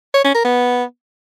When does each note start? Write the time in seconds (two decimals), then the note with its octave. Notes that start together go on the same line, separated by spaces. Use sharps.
0.14 C#5
0.24 C#4
0.35 A#4
0.45 B3